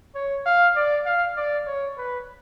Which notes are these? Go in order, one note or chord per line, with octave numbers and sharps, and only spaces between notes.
C#5
F5
D5
F5
D5
C#5
B4